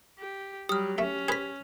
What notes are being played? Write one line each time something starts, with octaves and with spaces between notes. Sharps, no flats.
G4
F#3 G3 G4 D#6 F6
A3 C#4 E5
G#4 B4 C5 G#6 B6